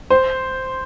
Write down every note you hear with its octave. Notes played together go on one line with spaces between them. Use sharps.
C5